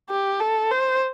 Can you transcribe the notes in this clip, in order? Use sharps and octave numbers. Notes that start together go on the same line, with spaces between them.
G4
A4
C5